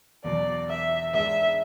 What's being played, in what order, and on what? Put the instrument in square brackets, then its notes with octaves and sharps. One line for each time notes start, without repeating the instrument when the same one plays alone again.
[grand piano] E1 E2 B2 F#3 [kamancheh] D5
[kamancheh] E5
[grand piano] G#2 G#3 D4 G#4 D5 [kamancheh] E5